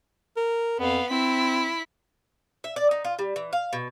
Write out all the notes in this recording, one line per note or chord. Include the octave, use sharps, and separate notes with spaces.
A#4
F2 B3 F5
C4 E4 B6
E5
D5
D#4
F4
G3
E3
F5
B2